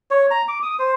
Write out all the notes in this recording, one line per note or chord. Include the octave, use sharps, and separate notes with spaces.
C#5
A#5
D6
D#6
C5